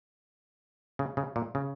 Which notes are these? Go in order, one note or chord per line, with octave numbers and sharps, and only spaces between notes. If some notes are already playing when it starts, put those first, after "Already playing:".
C#3
C#3
A#2
C#3